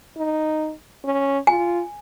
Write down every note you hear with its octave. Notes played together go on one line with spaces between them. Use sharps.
D#4
C#4
F4 G#5